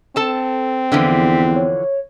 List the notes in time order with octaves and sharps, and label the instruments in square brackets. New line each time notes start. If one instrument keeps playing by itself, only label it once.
[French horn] C4 [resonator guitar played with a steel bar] A4 A5
[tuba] E2 [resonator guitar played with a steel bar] D3 E3 F3 [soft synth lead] B6
[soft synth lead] C#5